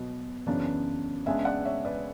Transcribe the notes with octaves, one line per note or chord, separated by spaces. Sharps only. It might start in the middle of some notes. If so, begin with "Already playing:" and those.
Already playing: B2 F#3 B3
F#2 C#3 E3 B3 D4
C#2 C#3 G#3 B3 D4 E5 G#5
D5 F#5
C#5 E5
B4 D5